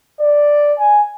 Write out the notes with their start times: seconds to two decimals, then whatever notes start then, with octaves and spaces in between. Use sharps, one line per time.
0.20 D5
0.79 G#5